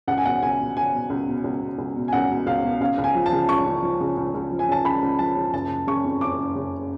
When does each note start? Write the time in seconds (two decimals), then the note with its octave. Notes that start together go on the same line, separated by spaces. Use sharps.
0.08 C#2 F#5
0.18 G#5
0.25 B2 F#5
0.42 C#2 G#5
0.59 B2
0.76 C#2 G#5
0.93 B2
1.10 C#2
1.28 B2
1.44 C#2
1.62 B2
1.78 C#2
1.96 B2
2.08 G#5
2.13 C#2 F#5
2.30 B2
2.46 C#2 F5
2.64 B2
2.80 C#2 F5
2.98 C#2
3.04 G#5
3.15 F3
3.26 A5
3.32 C#3
3.48 C#2 C#6
3.66 C#2
3.82 F3
4.00 C#3
4.17 C#2
4.34 C#2
4.52 F3
4.59 G#5
4.68 C#3 A5
4.85 C#2 B5
5.02 C#2
5.19 F3 A5
5.36 C#3
5.53 F#1 A5
5.71 F#1
5.87 C#3 C#6
6.04 F2
6.21 F#1 D6
6.38 F#1
6.55 C#3